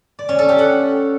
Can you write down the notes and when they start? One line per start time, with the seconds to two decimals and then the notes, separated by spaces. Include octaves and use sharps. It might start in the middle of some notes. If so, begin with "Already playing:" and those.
0.19 D5
0.29 C#4
0.39 A4
0.49 G4
0.59 F#5